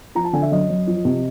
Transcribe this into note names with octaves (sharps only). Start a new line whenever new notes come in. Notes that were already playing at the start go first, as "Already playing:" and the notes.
F3 A#5
A5
D3 G#5
E5
F#2 D#5
F#2
F3
C3